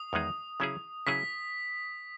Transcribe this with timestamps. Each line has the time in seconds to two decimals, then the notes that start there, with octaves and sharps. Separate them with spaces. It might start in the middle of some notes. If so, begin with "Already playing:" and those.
Already playing: D#6
0.13 E2 D#3 G#3 D#4 G#4
0.60 C#3 F#3 C#4 E4 G#4
1.07 C#3 F#3 C#4 E4 G#4 B6